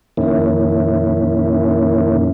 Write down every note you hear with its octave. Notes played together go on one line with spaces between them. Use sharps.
F2 A#2 D#3 A#3 C#4 E4